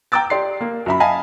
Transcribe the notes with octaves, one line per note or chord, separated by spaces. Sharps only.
G5 A#5 D6 E6 A6
G4 D5 C6 C7
A#3
F#2 E5 B5
D#5 F5 G#5 A5 B5